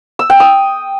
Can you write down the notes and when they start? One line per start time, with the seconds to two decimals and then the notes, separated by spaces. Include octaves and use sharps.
0.19 E6
0.30 G5
0.40 D#6